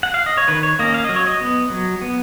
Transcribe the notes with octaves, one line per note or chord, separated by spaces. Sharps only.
F#5
F5
D#5
C#5
D#3 B4
C#5
A#3 C#4 D#5
F5
F#3 D#5
C#5
D#5
B3
F#3
B3